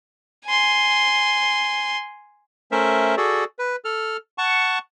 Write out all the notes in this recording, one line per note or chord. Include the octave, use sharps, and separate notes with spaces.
G#5 C6
A3 C#4 A#4 C5 E5
F#4 G#4 A4 D5
B4
A4 F6
F#5 A5 C#6